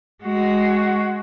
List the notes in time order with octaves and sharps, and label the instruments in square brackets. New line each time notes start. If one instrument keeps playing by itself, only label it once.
[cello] G#3 F#4